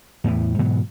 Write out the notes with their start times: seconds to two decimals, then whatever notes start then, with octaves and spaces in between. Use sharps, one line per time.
0.24 E2 A2 E3
0.59 G#2 B2 E3 F#3